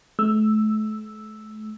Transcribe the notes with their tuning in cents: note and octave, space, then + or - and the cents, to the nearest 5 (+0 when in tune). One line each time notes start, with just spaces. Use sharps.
A3 -35 E6 +0